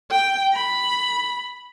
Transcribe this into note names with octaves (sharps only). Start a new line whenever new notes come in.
G5
B5